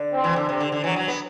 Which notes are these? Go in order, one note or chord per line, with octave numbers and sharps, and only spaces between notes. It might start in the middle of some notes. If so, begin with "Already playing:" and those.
Already playing: D3
C4
E3
D3
C3
D3
D3
E3 F#3
F#3
B3